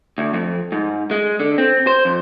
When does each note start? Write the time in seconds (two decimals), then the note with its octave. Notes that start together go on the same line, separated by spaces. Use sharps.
0.18 D2
0.34 F2
0.72 G#2
1.11 G#3
1.40 D3
1.58 C4
1.87 C5
2.05 F2